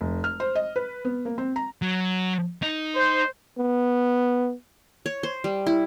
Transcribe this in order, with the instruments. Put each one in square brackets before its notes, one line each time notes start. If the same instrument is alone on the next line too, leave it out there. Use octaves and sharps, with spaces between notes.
[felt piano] F1
F6
C5
D#5
B4
B3
A#3
C4
A#5
[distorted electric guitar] F#3
D#4
[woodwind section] C5
[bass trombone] B3
[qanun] C#5
C5
G3
E4